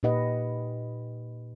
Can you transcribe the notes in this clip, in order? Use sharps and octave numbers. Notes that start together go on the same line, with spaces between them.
A#2 D#4 G4 B4 D#5 F#5